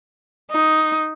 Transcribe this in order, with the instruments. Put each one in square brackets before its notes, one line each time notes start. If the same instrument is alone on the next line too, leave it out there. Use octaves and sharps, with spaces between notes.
[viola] D#4